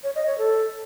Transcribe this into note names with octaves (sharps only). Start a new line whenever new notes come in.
C#5
D#5
C#5
A4